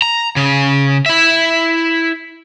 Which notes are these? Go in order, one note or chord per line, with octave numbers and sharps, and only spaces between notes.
A#5
C#3
E4 E5